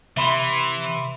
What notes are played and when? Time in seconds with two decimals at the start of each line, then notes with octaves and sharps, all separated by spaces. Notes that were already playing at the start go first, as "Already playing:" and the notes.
0.17 C3 E3 E5 B5 C6